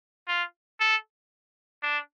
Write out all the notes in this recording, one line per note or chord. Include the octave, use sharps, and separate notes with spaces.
F4
A4
D4